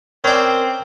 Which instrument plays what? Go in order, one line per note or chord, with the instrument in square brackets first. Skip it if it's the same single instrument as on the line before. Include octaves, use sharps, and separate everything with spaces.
[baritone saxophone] C4 [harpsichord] C#4 D5 [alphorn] A#4